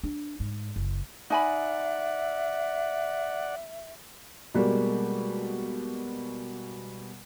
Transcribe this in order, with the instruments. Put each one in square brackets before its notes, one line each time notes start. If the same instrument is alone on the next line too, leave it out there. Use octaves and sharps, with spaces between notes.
[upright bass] D4
G#2
F#1
[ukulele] D#4 G#5 B5 [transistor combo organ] D5 F#5 [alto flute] E5
[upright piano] B2 G3 G#3 A#3